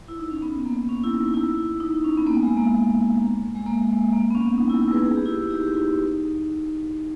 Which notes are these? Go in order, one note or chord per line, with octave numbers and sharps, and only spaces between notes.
E4
D#4
C#4
B3
A#3
C#4
E4
D#4
E4
D#4
C#4
B3
A#3
G#3
A#3
G#3
A#3
G#3
A#3
B3
C#4
D#4
E4
E4
G#4 B4
G#4
G4
E4 G#4
D#4 G4
G4
E4
D#4